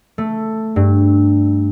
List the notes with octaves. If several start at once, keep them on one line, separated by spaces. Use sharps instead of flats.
A3
G2